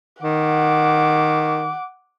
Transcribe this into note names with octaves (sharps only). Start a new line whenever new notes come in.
D#3 F#5 D6